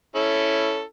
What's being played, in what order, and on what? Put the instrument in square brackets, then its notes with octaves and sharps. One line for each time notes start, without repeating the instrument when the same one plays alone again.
[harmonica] C#4 E4 A4